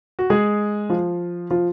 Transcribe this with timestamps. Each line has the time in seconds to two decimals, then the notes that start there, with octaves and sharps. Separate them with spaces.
0.19 F#4
0.30 G#3 G#4
0.89 F3 F4
1.50 F3 F4